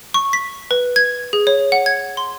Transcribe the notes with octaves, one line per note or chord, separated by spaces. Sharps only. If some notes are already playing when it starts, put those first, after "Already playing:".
C#6
B6
B4
G#6
G#4
C#5
F#5
G#6
C6